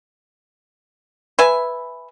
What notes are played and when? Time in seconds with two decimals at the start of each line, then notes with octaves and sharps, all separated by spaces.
1.39 B4 E5 G#5